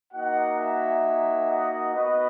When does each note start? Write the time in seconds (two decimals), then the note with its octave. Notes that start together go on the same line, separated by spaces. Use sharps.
0.12 A#3 D#4 F#4 D#5 F#5
0.58 E5 G#5
1.49 D#5 F#5
1.94 B3 F#4 B4 D#5